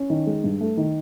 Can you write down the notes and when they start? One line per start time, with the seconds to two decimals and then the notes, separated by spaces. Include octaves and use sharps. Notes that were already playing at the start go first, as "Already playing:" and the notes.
Already playing: C#4
0.10 D#3
0.27 G#3
0.44 G2
0.61 A3
0.77 D#3